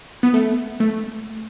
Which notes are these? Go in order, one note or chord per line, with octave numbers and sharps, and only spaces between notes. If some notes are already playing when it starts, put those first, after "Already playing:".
B3
A3
A3